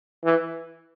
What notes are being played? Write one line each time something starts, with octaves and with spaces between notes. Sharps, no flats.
E3